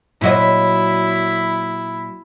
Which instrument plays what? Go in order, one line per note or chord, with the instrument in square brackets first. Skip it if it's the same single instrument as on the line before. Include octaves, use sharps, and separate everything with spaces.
[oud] A#2 F#3 D#5 [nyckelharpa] E4 B5